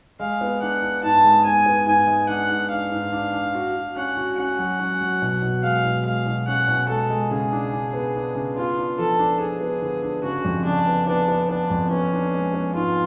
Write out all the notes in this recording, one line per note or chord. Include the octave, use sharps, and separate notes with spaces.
G#3 F5
B3
D4 F#5
D4
G#2 A5
G#3
B3 G#5
B3
G#2 G#5
G#3
D4 F#5
G#2
D4 F5
G#2
D4
D4
F#4
F#4
C#4 F#5
F#4
C#4 F#5
F#3
C#4
F#3
B2
B2
G#3 F5
B2
G#3 F5
B2
C#4 F#5
B2
G#3 A4
G#3
C#3 G#4
D4
D4
B3
D4
C#3
B3 F4
D4
F3 A4
D4
D4 G#4
B3
D3
D4
C#3 F#4
F2
C#3 D4
B3
B3 D4
B3
B3 D4
F2
B3 C#4
D4
G#3
B3
G#2 F4